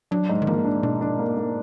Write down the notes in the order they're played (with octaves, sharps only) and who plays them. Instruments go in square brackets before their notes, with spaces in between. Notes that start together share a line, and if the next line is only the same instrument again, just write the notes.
[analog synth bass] F#3 [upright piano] D4
[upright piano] G#2
[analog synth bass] D#3
[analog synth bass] F3 [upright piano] A#3
[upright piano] D4
[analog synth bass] B2 [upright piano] D4
[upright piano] D4
A#3
A#3